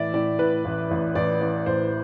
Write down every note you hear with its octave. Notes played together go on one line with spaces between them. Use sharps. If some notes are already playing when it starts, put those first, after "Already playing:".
Already playing: A2 E3 D5 E5
A2 D5
A2 B4
A1
A1
A1 D5
E3 D5
A1 C5